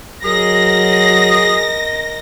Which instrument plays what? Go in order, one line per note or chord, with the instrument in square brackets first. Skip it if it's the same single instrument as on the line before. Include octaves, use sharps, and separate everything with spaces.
[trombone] F#3 [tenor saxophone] G#4 [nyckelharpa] A#4 D#5 [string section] A#6